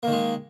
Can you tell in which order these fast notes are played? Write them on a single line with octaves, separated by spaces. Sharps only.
A#3 D#3 G#3